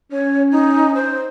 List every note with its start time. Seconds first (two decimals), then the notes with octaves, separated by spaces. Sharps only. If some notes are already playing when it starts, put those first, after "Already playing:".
0.12 C#4 C#5
0.52 D#4
0.95 C5